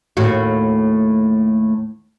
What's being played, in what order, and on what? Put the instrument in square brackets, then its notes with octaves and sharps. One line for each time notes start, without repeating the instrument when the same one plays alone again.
[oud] D#2 A2 F#4